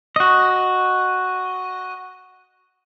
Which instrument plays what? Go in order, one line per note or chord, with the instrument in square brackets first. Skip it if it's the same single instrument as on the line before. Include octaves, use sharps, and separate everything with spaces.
[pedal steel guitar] F#4 D#5